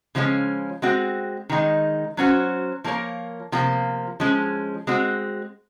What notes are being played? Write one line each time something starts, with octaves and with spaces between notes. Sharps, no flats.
C#3 F3 G#3 C#4
G#3 C4 F#4
D#3 G#3 D#4
F#3 C#4 F#4 C5
F3 A#3 F4 A#4 C#5
C3 F3 A#3
F3 G#3 C#4
G#3 C4 F#4